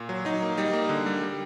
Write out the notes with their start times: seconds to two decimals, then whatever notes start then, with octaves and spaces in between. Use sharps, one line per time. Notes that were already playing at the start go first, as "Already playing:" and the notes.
Already playing: A#2
0.09 F#3
0.25 F#3 D#4
0.42 A#3
0.57 G3 D#4
0.73 A#3
0.89 D3
1.06 G3
1.21 G3